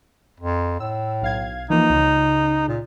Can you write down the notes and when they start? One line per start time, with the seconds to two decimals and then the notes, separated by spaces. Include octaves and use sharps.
0.40 F2
0.80 A2 E6
1.22 B1 F5 G#6
1.70 E3 F3 A#3 D#4
1.90 C#2 C#3
2.68 A#2